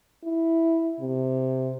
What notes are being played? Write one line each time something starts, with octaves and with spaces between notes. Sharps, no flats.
E4
C3